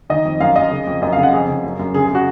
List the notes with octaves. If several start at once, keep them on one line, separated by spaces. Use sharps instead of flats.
D#3 D#5
F2
F#2 F5
F#2 D#5
C#3
F2
F#2 D#5
F5
C#3
F#5
F2 G#4
C#3
F#2
F#2
C#3 G#4
G#4
C#3 F#4